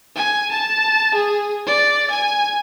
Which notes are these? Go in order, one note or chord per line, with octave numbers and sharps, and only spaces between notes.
G#5
A5
G#4
D5
G#5